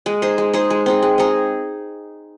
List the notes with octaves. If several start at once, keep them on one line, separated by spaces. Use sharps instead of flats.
G#3
D#4 G#4 C5
G#3
D#4 G#4 C5
G#3
C4 D#4 G#4
G#3
C4 D#4 G#4